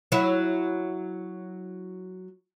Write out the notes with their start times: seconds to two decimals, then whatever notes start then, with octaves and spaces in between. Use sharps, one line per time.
0.12 F#3 E4